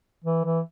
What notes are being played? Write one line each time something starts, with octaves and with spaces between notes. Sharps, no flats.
E3
E3